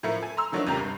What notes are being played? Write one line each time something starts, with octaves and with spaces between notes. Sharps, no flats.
A2 F3 A3 E4 A#4 C#7
A4 G#5
A#5 C6 E6
D#3 F3 F#3 A3 C#4 D4
G#1 D#2 C3 G4 A#5 G6
G2